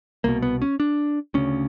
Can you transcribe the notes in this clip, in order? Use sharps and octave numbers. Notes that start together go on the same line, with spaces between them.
C2 B2 A#3
B3
C#4
D4
D2 C#3 C#4